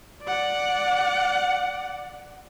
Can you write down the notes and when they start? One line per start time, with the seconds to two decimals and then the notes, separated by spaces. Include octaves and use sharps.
0.23 D5 F#5